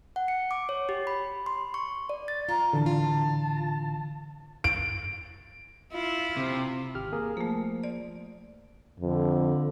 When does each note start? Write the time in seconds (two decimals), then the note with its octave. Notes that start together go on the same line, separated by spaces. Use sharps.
0.16 F#5
0.28 C#7
0.51 D6
0.69 C#5
0.89 G4
1.07 B5
1.46 C6
1.74 C#6
2.09 D5
2.28 A6
2.49 F4 A#5
2.73 A2 D3 E3 A5
2.86 F4
4.64 D7
5.93 E4 F4
6.37 C3
6.95 G#1 G4 F6
7.12 A#3 G#4 A#4
7.37 F3 A3 A#3
7.83 D5
9.00 F2 D3